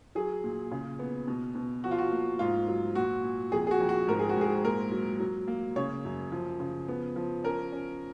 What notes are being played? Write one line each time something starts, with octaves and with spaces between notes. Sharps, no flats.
F#3 G#4
A#2
C#3
B3
B2
B2
F3 F#4
F4
F#4
A#3
G#2 F4
F#3
A#2 F#4
A#2
F2 G#4
G#4
F#4
F2
F#4
G#2 A#4
G#4
F#4
G#2 G#4
A#2 A#4
F#3
F#3
A#3
C#3 C#5
F#2
F3
C#3
B3
F3
C#4 A#4
C#4